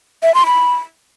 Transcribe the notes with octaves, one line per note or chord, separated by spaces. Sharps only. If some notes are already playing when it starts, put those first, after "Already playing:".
E5
C6
B5